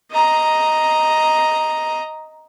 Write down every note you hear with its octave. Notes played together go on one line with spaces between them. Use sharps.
D#5 A#5